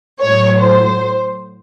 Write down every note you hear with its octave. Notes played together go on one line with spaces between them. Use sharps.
A2 F#3 C#5
C5